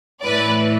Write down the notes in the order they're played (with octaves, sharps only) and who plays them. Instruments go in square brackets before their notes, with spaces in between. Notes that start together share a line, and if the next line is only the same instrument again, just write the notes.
[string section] A2 E3 B4 D5